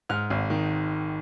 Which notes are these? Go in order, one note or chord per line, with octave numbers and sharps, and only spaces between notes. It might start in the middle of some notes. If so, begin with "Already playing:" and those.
G#2 F6
G#1
D#3